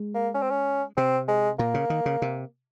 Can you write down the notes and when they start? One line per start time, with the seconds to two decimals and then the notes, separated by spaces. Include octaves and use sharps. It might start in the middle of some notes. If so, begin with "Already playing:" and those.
Already playing: G#3
0.14 A#3
0.34 C#4
0.42 C4
0.50 C#4
0.97 C3 C4
1.28 G#3
1.59 A#2 A#3
1.74 C#3
1.90 D#3
2.06 C#3
2.22 C3